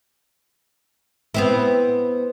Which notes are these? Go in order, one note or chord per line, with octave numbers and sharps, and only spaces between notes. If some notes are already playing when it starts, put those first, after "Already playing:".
B3 C4 E4